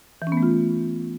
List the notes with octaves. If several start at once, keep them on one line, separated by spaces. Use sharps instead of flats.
E3
C#4
B3
A3
F4